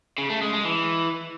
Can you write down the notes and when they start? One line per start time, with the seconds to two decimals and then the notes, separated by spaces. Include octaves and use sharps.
0.18 C#3
0.30 A3
0.41 G#3
0.53 G#3
0.65 E3